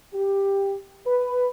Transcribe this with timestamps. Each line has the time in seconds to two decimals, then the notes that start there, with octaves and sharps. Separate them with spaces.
0.14 G4
1.06 B4